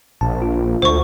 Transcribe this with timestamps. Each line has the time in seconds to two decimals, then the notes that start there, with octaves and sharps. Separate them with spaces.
0.21 A#1 A5
0.42 F4
0.82 D2 C5 C#6